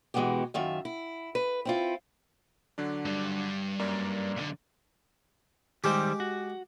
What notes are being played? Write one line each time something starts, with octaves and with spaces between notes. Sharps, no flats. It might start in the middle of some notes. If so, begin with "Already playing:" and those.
B2 E3 G#3 B3 F#4 G4
F#2 D#3 F4 E5
E4
B4
C4 E4 F4
D3 F#3 D4
G2 G3
F#2 A#3 D5
B1 D3
D#3 G3 G#3 G4 C5
F#4